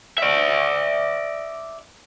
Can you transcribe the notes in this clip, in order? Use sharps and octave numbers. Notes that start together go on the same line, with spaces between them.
D5 E5